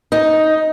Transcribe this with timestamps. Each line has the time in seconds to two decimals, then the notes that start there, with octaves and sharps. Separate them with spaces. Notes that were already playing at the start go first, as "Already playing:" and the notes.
0.12 D#4